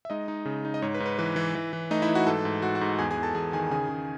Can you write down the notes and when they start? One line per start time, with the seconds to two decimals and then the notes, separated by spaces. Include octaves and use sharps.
0.05 E5
0.10 G#3 D#4 D#5
0.28 D#4
0.45 C#3
0.65 D#4
0.74 D#5
0.82 G#2 C#5
0.94 B4
1.00 G#2
1.06 B4
1.19 E3 B4
1.36 E3
1.55 E3
1.73 E3
1.91 A3 D#4 D#5
2.02 E4 E5
2.09 E3
2.15 F#4 F#5
2.26 G#2 A4 A5
2.45 G#2
2.62 G#2 F#4 F#5
2.75 F#4 F#5
2.81 G#2
2.99 E2 G#4 G#5
3.11 G#4 G#5
3.17 E2
3.23 A4 A5
3.35 E2 G#4 G#5
3.53 D#3 G#4 G#5
3.71 C#3 G#4 G#5
3.89 C#3